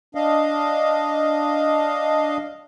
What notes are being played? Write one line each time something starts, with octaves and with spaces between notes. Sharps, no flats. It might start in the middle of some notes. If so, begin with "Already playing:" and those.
D4 D#5 F5